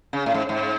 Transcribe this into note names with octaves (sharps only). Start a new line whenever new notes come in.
C#3
A2
G#2
G#2